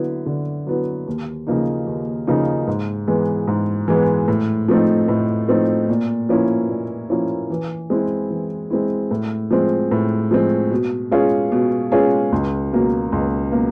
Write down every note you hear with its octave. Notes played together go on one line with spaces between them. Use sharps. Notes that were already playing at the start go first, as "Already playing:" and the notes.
Already playing: D3 F#3 B3 E4
D3
F#3 B3 E4
D#2
C#3 F3 A#3 D#4
D#2
C#3 F3 A#3 D#4
G#2
E3 G#3 B3
G#2
E3 G#3 B3
A2
F3 A3 C4 D#4
A2
F3 A3 C4 D#4
A#2
F3 A#3 C#4 E4
A#2
F3 A#3 C#4 E4
E3
G#3 C4 E4
E3
G#3 C4 E4
A2
F3 G#3 C4
A2
F3 G#3 C4
B2
G#3 C#4 F4 G#4
B2
G#3 C#4 F4 G#4
C#2
B2 F#3 A#3
C#2
B2 F#3 A#3